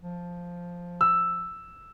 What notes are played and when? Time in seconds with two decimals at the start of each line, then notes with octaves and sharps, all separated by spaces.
0.01 F3
1.01 E6